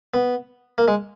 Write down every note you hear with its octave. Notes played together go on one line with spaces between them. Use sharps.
B3
A#3
G#3